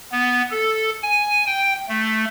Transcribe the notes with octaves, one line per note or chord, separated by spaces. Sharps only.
B3
A4
G#5
G5
A3